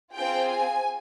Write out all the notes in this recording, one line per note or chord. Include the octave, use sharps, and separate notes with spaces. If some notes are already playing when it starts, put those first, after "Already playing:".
C4 F4 G#4 G5
G#5